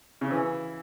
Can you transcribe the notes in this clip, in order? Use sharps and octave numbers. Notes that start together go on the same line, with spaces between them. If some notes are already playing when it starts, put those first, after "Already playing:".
C#3
E3